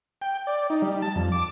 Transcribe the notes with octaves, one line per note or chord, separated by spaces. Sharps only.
G5
D5
D#4
G3
A5
F2
D6